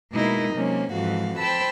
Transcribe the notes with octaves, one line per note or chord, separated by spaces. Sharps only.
B2 G#3 A#3 D#4 E4 A#4
C3 F#3 G#3 A#3 C4 C#4
F2 G#2 E3 F3 F#4 F5
C5 G5 A5 B5 E6